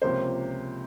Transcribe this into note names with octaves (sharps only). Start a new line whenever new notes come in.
C#2 C3 F3 A#3 C#4 C5